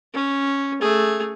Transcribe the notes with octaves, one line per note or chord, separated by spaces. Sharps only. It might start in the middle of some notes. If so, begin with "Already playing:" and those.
C#4
A3 G#4